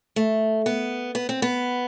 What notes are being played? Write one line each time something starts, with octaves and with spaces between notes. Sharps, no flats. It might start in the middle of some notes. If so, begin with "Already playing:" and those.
A3
B3
B3
C4
B3